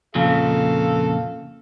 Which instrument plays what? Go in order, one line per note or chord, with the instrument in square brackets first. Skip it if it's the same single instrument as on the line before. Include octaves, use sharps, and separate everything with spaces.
[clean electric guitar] F2 A#2 C#3 [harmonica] A4 F5